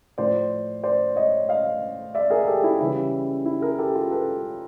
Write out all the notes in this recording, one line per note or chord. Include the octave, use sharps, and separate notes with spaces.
A2 F3 C5 D5
C5 D5
C#5 D#5
D#5 F5
D5 E5
G#4 A#4
G4 A4
E4
C#3 E3 G3 E4
E4
G#4 A#4
G4 A4
F4 G4
A4 B4